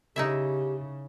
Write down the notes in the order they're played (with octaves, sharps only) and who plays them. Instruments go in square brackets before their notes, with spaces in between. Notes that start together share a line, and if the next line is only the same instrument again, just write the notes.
[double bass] C#3 [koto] D#4 E4 E5 [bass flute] G4